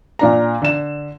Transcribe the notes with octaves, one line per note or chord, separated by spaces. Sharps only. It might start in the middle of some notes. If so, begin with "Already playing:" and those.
A#2 D4 A#5
D3 E7